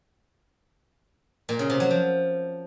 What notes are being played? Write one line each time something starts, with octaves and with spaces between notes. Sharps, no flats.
A#2
C#3
C3
F#3
F3